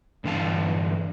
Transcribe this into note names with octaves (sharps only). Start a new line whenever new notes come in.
G2 D3 E3 F5 A5